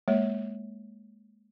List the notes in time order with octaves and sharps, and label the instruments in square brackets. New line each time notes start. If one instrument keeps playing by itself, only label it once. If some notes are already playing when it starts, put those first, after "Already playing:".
[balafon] G#3 A#3 C#5